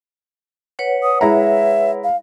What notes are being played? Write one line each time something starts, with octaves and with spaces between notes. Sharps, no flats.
B4 C#5 F#5
D#6
G#3 E4 E5 A#5
F5